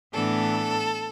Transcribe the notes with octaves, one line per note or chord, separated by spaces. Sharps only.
A2 E3 B3 D4 A4